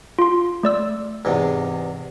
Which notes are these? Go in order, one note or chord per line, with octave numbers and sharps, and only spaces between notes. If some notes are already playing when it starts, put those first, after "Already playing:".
F4 C6
A3 D5 E6
E2 G#2 C3